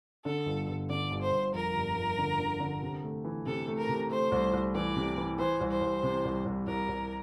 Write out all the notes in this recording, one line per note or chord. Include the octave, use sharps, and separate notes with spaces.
D3 A4
G1
G1
D3 D5
G1
C5
G1
F2 A#4
G1
G1
D3
D3
D3
C3
A3
E3
C3 A4
A3
A#4
C3
A3 C5
C2
C2
E3 D5
C3
E3
E3 C5
C2
C5
C2
C3
C2
C2
C2 A#4
C2